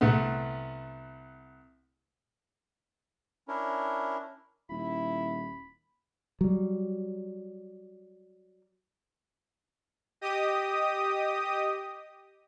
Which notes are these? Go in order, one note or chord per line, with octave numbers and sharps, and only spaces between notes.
C2 A3 B3
C#4 D4 E4 A#4
D#1 E4 B5
F#3 G3
G4 D#5 D#6